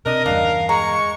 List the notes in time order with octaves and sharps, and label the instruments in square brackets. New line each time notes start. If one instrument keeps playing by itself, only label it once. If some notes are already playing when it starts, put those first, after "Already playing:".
[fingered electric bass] C3 [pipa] D4 [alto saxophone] A#4 [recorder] D#5
[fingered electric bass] E2 G2 C#3 [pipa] D4 [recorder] F5
[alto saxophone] G#3 [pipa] A#5 [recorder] C#6